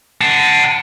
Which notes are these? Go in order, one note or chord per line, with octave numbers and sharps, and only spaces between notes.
F#5 A5